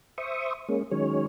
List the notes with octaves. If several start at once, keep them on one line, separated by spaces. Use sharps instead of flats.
C5 E5 C#6 D#6
G#3 A#3 C#4
D#3 F#3 G#3 C#4 C#5